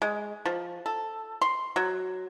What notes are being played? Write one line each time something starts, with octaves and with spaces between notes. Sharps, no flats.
G#3
F3
A4
C6
F#3